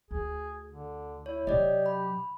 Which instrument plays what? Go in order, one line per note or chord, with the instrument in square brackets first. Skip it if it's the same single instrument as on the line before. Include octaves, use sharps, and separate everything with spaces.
[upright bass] D2 [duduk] G#4
[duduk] D3
[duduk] E4 [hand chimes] C#5
[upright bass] C3 F#3 [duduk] G4 [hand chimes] D5 D#5
[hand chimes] B5